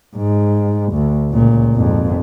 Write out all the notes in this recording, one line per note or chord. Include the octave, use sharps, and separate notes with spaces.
G#2
D2
C#2 A#2
G#1 F2